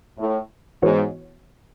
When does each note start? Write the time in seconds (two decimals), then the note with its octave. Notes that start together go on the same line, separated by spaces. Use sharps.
0.18 A2
0.82 G#2 E3 B3 F#4 C#5